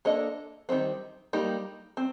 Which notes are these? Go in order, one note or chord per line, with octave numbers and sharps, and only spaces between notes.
A#3 D4 A4 D#5
D#3 G3 C4
G3 A#3 D#4 G4
C4